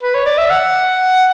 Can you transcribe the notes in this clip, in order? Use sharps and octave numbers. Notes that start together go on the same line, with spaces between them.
B4
C#5
D5
E5
F#5